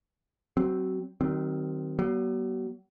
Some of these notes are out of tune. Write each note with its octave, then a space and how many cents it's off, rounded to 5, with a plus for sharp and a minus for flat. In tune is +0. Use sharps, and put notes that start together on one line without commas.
F#3 +25 C4 +0
D#3 +0 F#3 +45 C4 +0
F#3 +40 B3 -40